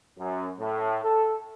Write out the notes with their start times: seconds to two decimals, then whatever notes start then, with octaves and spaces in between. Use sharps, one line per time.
0.18 F#2
0.59 A2
1.03 A4